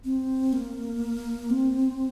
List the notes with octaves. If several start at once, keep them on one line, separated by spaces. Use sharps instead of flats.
C4
A#3
C4